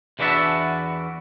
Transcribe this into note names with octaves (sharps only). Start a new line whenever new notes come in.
E2 E3 D4 F#4 E5 A5